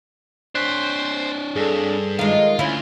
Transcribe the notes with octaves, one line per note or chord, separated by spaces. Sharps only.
D4 C5 C#5 F#6 B6
G2 G#4 A4
D#3 G#3 F4
D2 C#4 E4 F5